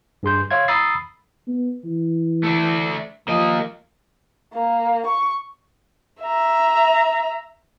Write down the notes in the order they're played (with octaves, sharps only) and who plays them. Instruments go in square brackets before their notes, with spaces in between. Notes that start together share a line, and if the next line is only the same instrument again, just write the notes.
[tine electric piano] G2 G#4 C6 G6
C#5 E5 F5 C6 G#6
A#5 B5 D#6 E6 A6 C7
[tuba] B3
E3
[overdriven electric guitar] A3 D4
[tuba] F3 [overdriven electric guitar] A#3 D#5
[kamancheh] A#3
C#6
E5 A#5